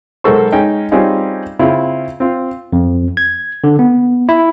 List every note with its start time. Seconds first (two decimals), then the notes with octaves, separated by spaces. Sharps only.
0.24 B1 G#3 A4 A#4 C5 C#6
0.52 G#3 C#4 D#4 G5
0.91 G3 C4 C#4 D#4 F4 G#4
1.59 C#3 C4 E4 F4
2.20 C4 F4
2.73 F2
3.17 G#6
3.64 D3
3.79 B3
4.29 E4